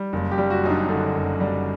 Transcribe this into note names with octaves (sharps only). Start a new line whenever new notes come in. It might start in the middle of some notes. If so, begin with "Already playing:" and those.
Already playing: G3
F#1
G4
G3
F#4
F#2 D#4
D4
D3
F#1
G3